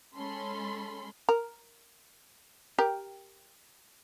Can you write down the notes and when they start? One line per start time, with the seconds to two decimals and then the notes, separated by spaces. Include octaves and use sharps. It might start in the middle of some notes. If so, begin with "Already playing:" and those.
0.15 G#3 C#4 A4 B5 C6
1.29 A#4
2.78 G4 A#4